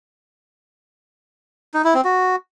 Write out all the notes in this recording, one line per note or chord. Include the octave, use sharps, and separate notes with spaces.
D#4
E4
C4
F#4